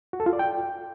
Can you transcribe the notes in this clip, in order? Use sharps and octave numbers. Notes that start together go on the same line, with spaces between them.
F#4
A4
F4
D5
G5